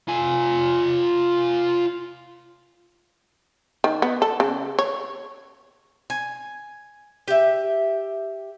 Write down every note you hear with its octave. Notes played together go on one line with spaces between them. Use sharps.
F4 G#5
D#3
B3
A4
C#3
C#5
G#5
G4 E5